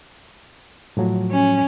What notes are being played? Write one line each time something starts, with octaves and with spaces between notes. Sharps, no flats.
A2 F3 F#3
C#4